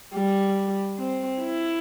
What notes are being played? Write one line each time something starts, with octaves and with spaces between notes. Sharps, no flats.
G3
C4
E4